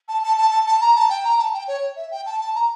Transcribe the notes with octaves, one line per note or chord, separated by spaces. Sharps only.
A5
A5
A5
A5
A5
A#5
A5
G5
A#5
A5
G5
C#5
E5
G5
A5
A5
A#5